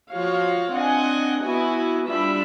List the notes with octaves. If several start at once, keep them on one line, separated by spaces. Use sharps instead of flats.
F3 F#4 C#5 F5
C4 D4 D#5 F#5 G#5
B3 E4 F#4 G#5
G3 D4 F4 E5 B5